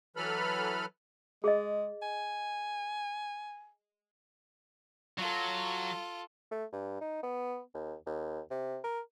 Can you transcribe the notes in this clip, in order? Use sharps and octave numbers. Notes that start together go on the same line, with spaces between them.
E3 F#3 A4 B4 B5 F6
G#3 G#4 D#5
G#5
F#3 F4 A4
A3
G2
D#4
B3
D#2
D#2
C3
A#4